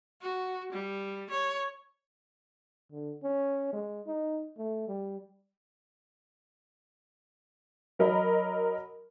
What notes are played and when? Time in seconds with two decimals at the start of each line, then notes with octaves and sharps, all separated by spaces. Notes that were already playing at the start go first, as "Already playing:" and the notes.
0.22 F#4
0.72 G3
1.30 C#5
2.92 D3
3.24 C#4
3.73 G#3
4.07 D#4
4.58 A3
4.88 G3
7.99 F#3 A#4 D#5 B5